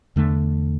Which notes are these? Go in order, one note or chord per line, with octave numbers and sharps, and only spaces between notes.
E2 D3 A3